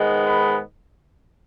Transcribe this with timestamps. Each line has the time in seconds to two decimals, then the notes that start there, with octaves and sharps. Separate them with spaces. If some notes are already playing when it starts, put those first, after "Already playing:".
Already playing: G#2 D#3 G#3 B3
0.26 B5